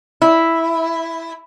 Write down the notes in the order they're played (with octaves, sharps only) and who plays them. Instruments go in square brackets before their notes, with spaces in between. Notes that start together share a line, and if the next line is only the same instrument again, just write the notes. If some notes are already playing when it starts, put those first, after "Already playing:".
[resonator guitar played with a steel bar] E4